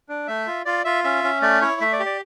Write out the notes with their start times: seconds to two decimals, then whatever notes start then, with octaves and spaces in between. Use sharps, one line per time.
0.09 D4
0.27 A3 E5
0.47 F4
0.65 F4 D5
0.85 F4 E5
1.04 C#4 E5
1.24 C#4
1.42 A3 D5
1.62 E4 C#5
1.81 A3 E5
1.93 D5
2.00 G4
2.06 D5